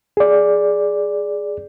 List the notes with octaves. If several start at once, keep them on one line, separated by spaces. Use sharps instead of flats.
G#4 D5